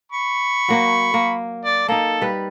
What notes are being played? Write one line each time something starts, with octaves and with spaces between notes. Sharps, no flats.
B5 C#6
F#3 A#3 F#4
A#3
D5
A#3 D#4 A4
G3 B4